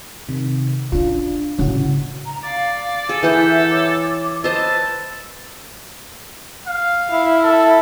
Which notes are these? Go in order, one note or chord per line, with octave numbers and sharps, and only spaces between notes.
C3 D#3
C#4 D4 F4
A2 C#3 C#4 F#4
A#5
D5 F5
G#4 A4
E3 E5 F#5 G6
C#5 D6
B4 C5 D#5 A5 E6
F5
E4
A4